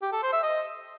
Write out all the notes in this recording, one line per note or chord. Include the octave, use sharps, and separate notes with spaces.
G4
A4
C5
E5
D#5